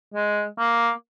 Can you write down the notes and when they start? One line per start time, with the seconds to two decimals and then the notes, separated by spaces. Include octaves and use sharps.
0.14 G#3
0.58 A#3